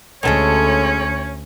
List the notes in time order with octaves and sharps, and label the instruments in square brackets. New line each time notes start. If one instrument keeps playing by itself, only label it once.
[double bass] D2 [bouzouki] G#3 A4 A#5 [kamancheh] C#4 [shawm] C#5